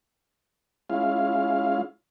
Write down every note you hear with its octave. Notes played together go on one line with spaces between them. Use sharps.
G#3 C#4 E4 F4 F5